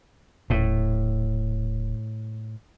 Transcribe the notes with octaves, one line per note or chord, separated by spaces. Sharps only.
D#1 A2